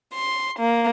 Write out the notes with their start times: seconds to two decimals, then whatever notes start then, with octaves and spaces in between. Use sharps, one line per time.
0.14 C6
0.59 A#3